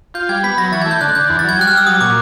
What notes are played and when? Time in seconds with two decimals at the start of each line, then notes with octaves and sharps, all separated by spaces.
0.14 F4 G6
0.29 G3 G#6
0.43 B3 B6
0.57 F#3 A#6
0.72 E3 A6
0.82 A3 G#6
0.91 G6
1.01 D3 F#6
1.15 D3 G6
1.29 E2
1.39 A6
1.44 F#3 G#6
1.58 G3 F#6
1.68 F6
1.73 G3 E6
1.86 F#3 D#6
2.01 A#2 D6